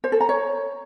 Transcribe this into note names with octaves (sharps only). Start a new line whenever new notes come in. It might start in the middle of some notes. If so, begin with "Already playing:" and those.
C5
A4
A#5
C#5